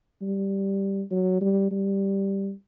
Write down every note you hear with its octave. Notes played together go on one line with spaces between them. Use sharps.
G3
F#3
G3
G3